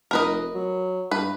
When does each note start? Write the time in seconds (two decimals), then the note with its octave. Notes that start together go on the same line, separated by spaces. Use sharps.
0.11 F1 A#4 B4 D#5
0.54 F#3
1.11 G2 B4